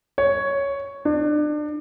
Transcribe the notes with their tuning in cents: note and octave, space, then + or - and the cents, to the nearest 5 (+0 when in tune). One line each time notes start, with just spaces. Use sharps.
C#5 +5
D4 +30